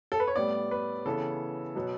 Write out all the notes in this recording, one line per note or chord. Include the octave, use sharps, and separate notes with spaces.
A4
B4
C#5
A2 G3 B3 D5
B4
C#3 E3 B3 A4
B2 F#3 B3